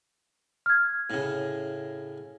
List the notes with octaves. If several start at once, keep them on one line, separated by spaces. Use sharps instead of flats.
F6 G#6
A2 C#3